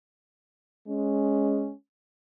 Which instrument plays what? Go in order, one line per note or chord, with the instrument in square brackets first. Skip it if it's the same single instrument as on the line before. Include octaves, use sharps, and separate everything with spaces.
[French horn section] G#3 C#4